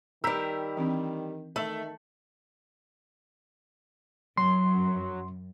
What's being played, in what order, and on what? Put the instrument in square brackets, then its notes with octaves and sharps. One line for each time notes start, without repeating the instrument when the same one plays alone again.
[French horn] D#3 [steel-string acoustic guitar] G3 A#4 [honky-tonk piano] E6 G6 B6
[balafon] E3 C4 D4
[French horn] D#3 [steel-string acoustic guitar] A3 [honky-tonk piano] E5 E6 F#7
[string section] F#2 [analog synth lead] F#3 [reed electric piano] C6